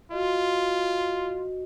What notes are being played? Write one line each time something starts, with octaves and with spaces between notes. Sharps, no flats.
F4 F#4 D#5